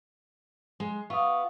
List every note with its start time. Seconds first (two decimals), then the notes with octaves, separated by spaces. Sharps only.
0.80 G#3
1.10 B3 F4 E5 C#6 D#6